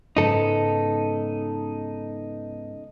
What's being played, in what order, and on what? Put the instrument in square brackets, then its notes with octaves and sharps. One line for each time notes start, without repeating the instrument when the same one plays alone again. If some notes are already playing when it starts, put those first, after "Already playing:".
[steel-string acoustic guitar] G#2 C#3 B3 [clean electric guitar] D#4 A4